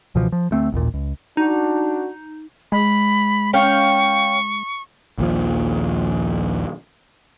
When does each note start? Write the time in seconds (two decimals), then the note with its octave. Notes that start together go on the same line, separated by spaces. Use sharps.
0.15 C#2 B2 E3 F3
0.32 F3
0.51 D2 A3 C4
0.72 A1 D#2 A#2
0.94 C#2
1.37 D4 D#4 F#4
2.72 G#3 B5
3.53 C#4 F5 G5 C#6
5.18 A#1 D#2 F3